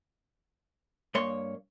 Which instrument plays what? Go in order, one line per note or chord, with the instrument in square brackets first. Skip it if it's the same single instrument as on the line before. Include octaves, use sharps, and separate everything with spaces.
[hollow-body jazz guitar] G2 A#3 C#5 C6